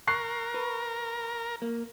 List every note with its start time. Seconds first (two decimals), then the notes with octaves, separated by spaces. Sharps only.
0.07 A#4 C#6 F#6 C7
0.54 B4
1.62 A#3